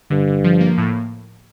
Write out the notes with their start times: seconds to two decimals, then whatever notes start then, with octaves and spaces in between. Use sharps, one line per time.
0.10 G2 D3
0.27 D3
0.44 F3
0.61 A#3
0.78 A2